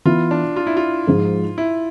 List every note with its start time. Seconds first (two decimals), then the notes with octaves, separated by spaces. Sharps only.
0.05 E3 B3 E4 F4
0.31 D4
0.56 F4
0.67 E4
0.77 F4
1.07 G#2 F3 G#3
1.58 E4